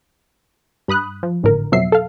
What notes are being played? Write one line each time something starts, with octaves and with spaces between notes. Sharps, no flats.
G2 B5 D#6 F#6
F3
G#1 A2 D3 A#4
F2 B2 F#3 E5 C7
A4 F5